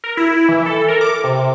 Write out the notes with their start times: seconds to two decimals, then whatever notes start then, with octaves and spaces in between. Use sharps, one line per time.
0.04 A#4
0.17 E4
0.49 E3
0.66 A4
0.88 A#4
1.01 D6
1.24 C3